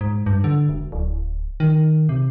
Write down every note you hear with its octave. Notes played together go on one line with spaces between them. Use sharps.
G#2
G2
D3
E1
D1
D#3
C3